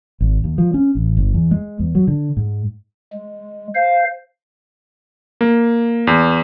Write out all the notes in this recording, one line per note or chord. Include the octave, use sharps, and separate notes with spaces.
G#1
D#2
F3
C#4
A1
G1
E2
G#3
E2
F#3
D3
G#2
G#3
C5 F5
A#3
E2